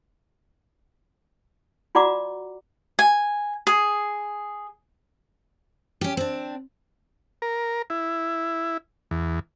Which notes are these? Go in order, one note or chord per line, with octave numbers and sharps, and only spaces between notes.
F4 F#4 D5 F#5 A#5 D6
G#5
G#4
C#4 G4
C4 D4
A#4
E4
E2